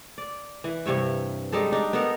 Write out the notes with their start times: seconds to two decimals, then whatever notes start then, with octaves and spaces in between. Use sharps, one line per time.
0.18 D5
0.64 E3
0.86 G2 C3 C#5 E5
1.52 G3 G#3 D#4 A4
1.72 D4 D#4
1.93 B3 D#4 A4 A#4